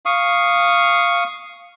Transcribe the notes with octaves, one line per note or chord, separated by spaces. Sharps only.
F5 C#6 D#6